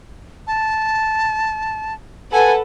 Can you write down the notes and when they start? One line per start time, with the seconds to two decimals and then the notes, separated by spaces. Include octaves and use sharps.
0.47 A5
2.32 A4 B4 F#5 G#5